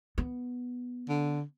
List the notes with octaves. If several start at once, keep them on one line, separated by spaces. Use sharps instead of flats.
B3
D3